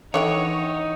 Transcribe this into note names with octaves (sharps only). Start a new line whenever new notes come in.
D3 E3 D#4 C#5 F#5 G5